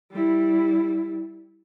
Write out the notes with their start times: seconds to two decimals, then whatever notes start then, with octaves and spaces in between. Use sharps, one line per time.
0.12 G3 E4